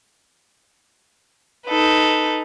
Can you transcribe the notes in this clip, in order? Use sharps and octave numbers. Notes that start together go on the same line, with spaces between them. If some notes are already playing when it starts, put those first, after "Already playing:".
D#4 A4 B4